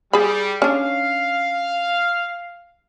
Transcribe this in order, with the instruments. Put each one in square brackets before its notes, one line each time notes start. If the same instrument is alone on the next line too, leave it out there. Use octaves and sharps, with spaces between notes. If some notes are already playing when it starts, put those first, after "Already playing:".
[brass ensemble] G3 [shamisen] G#4 B5
[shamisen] C#4 D4 [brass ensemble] F5